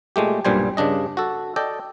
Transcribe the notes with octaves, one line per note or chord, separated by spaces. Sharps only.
A#2 G#3 A3 G4
B1 G2 A#2 G3 C5 G#5
G2 C#3 D4 D#5
F#4 A4
A4 D5 D#5 G5